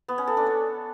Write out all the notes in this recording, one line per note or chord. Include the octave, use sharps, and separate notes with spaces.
B3
C#4
A4
D4
C#5